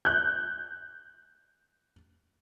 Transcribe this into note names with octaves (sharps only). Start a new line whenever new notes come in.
F#6 G6